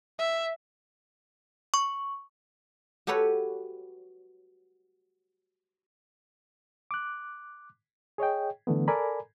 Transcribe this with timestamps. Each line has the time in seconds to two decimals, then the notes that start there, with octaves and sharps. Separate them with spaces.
0.19 E5
1.74 C#6
3.07 F#4 G4 A4 B4 C#5
6.91 D6 F#6
8.18 G#4 C#5 D#5 G5
8.67 D3 E3 A3 B3
8.88 A4 A#4 D5 G#5 A#5 B5